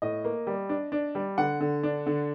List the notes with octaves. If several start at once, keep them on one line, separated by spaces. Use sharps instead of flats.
A2 D#5
A#3
G3
D4
D4
G3
D3 F#5
D3
D4
D3